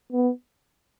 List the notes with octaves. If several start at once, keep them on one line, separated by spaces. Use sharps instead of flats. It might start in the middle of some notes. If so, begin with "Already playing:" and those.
B3